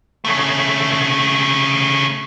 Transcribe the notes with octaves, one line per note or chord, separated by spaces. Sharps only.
C#3 A3